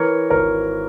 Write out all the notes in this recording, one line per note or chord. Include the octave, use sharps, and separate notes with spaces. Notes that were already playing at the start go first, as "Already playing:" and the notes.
Already playing: E3 A#4 C#5
G#1 A#4 C#5